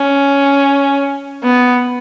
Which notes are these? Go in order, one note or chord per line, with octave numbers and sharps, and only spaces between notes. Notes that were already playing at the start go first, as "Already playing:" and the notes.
Already playing: C#4
B3